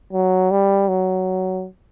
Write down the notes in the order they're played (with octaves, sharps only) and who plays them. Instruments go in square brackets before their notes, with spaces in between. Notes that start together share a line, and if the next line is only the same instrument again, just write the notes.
[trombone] F#3
G3
F#3